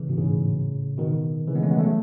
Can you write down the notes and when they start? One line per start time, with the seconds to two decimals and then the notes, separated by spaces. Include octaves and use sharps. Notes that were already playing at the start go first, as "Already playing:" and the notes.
Already playing: C#3 E3
0.08 G#2 B2
0.17 A2 C#3
0.98 B2 D#3
1.47 C#3 E3
1.55 G#3 B3
1.63 A3 C#4
1.71 G#3 B3
1.79 F#3 A3